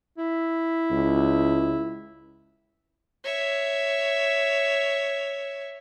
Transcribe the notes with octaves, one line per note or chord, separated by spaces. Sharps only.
E4
C#2
C#5 E5